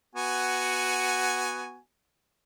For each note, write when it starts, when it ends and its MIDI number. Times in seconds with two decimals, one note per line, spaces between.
0.15 1.79 59
0.15 1.79 66
0.15 1.79 80